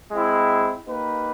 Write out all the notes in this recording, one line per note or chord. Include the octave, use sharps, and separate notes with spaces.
G#3 C4 E4
A#3 D#4 G4 B4